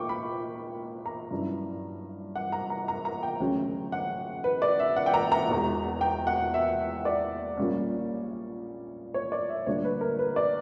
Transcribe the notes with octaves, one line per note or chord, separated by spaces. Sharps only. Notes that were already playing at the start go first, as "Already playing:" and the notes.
Already playing: A#2 A#3 G5 C#6 D6
B5
A#5
G2 F#3 C#4 E4
F#5
A#5
A#5
A#5
A#5
G5
D2 C#3 F#3 C#4
F#5
B4
D5
E5
F#5
G5
A#5
A#5
E1 E2 B2
G5
F#5
E5
D5
A#1 A#2 G3 A#3 C#4
C#5
D5
E5
D2 D3 G3 A#3 D4 C#5
B4
A#4
B4
D5